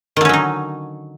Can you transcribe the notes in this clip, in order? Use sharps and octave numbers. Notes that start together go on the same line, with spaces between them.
D3 D#3 F#3 C#4 D#4